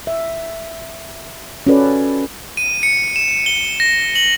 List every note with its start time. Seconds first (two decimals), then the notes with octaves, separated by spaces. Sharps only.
0.07 E5
1.67 C#4 F4 F#4 A4 B4 D5
2.57 D#7
2.83 C#7
3.16 E7
3.46 G7
3.80 A#6
4.15 F#7